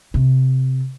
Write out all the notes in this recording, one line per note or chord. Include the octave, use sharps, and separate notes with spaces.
C3